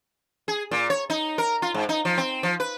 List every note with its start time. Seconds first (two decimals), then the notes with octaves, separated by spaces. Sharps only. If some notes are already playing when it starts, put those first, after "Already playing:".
0.48 G#4
0.71 A#2
0.90 C#5
1.10 D#4
1.38 A#4
1.62 F4
1.74 G#2
1.89 D#4
2.05 F3
2.18 C4
2.43 F3
2.60 B4